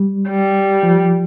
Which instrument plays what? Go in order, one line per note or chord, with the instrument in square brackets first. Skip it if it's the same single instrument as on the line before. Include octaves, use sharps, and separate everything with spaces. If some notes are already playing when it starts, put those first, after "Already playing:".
Already playing: [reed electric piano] G3
[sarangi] G3
[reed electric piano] F3